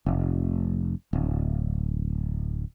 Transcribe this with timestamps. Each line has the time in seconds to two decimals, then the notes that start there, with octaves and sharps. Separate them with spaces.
0.06 F1
1.13 D1